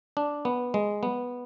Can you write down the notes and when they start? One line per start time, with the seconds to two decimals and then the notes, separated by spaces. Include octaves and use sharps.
0.17 D4
0.45 B3
0.74 G#3
1.03 B3